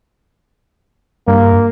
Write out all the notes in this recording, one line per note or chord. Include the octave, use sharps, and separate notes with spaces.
G2 A#3